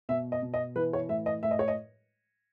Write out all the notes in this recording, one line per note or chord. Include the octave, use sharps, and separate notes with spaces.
B2 E5
D#5
B2
D#5
E3 B4
C#5
A2 E5
D#5
A2 E5
D#5
C#5
D#5